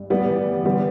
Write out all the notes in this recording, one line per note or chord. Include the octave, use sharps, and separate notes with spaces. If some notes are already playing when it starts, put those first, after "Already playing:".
Already playing: G2
A2 G3 B3
E3
E3
D3 G3 B3